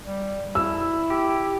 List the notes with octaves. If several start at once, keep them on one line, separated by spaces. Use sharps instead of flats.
G3
E4 E6
G4